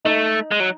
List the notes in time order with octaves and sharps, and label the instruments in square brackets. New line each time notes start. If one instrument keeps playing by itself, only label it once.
[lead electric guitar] A3 [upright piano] D#4
[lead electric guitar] G#3
F#3